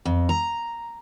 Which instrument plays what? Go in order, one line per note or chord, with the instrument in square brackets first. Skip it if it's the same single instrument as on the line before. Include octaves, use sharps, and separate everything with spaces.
[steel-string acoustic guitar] F2
A#5